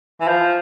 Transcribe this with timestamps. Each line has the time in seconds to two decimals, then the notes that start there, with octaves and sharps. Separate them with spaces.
0.21 E3
0.27 F3